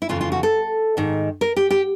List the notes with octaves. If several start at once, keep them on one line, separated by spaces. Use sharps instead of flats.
E4
F2 C#3 E3 F4
F4
F#4
A4
G#2 D#3
A#4
G4
G4